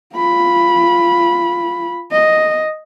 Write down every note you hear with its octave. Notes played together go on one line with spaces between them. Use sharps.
F4 B5
D#5